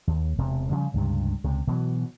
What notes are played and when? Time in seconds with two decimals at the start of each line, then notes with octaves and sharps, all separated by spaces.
0.07 D#2
0.38 E1 C3
0.69 C#3 F3 G3
0.94 C#2 G2 C3
1.44 C#2 C3
1.67 B2 E3 F#3